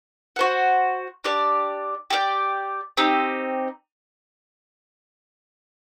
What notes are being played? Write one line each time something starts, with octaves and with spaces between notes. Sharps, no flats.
F#4 C5 F#5
D4 G4 D5
G4 D5 G5
C4 D#4 G4